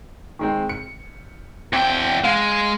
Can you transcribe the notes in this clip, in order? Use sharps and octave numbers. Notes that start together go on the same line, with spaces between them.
D#3 G#3 C4
C#7
E2 C4 G5
G#3 F5